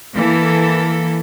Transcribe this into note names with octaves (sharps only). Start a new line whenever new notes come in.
E3 A#3 A4